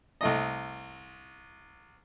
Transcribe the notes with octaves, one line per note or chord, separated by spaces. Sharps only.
C2 A3 D#5